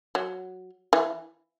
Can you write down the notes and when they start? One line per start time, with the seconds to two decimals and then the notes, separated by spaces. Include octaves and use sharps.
0.15 F#3
0.93 E3